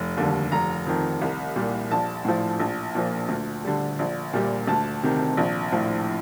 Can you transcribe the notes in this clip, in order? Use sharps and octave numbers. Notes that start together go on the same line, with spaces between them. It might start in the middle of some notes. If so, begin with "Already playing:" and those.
Already playing: F1
D#2 D3 G3
F1 A#5
F2 D#3
C2
A#2 G3
A#1 A5
A2 F3
A#1
A#2 F3
D2
D3 G3
A#1
A#2 G3
D2 A5
C3 D#3
A#1
A2 F3